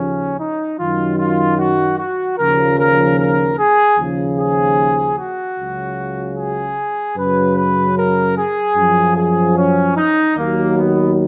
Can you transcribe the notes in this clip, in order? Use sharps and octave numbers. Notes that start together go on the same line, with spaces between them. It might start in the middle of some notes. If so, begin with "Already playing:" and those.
Already playing: D#2 C#3 F3 C#4
D#4
F#2 D#3 F#3 F4
F4
F#4
F#4
D#2 C#3 F3 A#4
A#4
A#4
G#4
D#2 C#3 F3
G#4
F#4
C#2 C#3 F#3
G#4
F#2 C#3 F#3 B4
B4
A#4
G#4
F#2 F3
G#4
C#4
D#4
D#2 D#3 F#3 A#3
B3